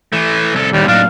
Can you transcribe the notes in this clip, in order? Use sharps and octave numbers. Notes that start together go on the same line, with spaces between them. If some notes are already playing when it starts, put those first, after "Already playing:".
E3 A3
C2 A4
D#2 A2 D#3 G3
A2 F#3 A#3 D4 D#4 F5